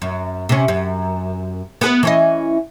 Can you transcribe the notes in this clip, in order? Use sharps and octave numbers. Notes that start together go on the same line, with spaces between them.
F#2
C3 C#4
F#2
B3 G#4 B4
E3 C#4 D#5